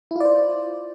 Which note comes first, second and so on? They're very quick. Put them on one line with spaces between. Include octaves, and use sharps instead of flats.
E4 F4 D5 C5